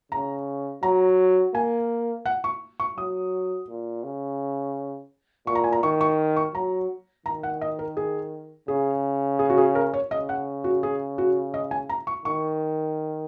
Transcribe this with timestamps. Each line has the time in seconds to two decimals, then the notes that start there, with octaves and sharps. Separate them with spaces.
0.12 C#3 A#5
0.83 F#3 A#5
1.54 A#3 G#5
2.26 F#5
2.44 C#6
2.80 C#6
2.97 F#3 D#6
3.69 A#2
4.04 C#3
5.47 A#2 C#6
5.55 A#5
5.64 G#5
5.72 A#5
5.83 D#3 C#6
6.01 C#6
6.37 C#6
6.55 F#3 A#5
7.26 D#3 A#5
7.43 F#5
7.61 D#5
7.79 A#4
7.97 G#4
8.68 C#3 G#4
9.39 G#4
9.50 F#4
9.57 G#4
9.75 A#4
9.94 C#5
10.11 C#3 D#5
10.29 F#5
10.64 F#4
10.83 G#4
11.18 F#4
11.54 D#5
11.71 G#5
11.89 A#5
12.07 C#6
12.25 D#3 C#6